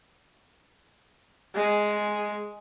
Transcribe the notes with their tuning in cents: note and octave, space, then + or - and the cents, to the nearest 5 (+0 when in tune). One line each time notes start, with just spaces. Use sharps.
G#3 +5